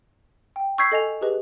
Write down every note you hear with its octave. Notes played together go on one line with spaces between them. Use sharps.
G5
C#6 E6 G6 G#6 B6 C7
A4 D#5 G#5 F7
G4 G#4 B4 D#5